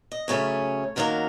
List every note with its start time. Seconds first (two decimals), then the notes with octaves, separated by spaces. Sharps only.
0.12 D#5
0.28 F#2 C#3 A3 C#4 C#5
0.96 F#2 D#3 F#3 A#3 A#4